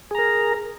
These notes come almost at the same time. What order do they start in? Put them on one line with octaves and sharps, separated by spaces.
G#4 A#5 A#4